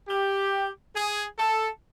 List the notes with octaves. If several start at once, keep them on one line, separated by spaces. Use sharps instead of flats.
G4
G#4
A4